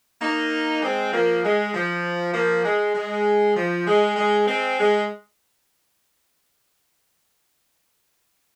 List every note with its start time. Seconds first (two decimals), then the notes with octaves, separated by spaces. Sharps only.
0.21 A#3 D#4
0.82 G#3 C4
1.13 F3 A#3
1.44 G#3
1.74 F3
2.34 F3 A#3
2.65 G#3
2.95 G#3
3.56 F3
3.87 G#3
4.16 G#3
4.47 G#3 C4
4.78 G#3